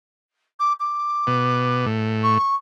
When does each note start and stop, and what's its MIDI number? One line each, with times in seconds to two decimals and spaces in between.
0.59 0.73 86
0.80 1.85 86
1.27 1.86 47
1.86 2.38 45
2.23 2.55 85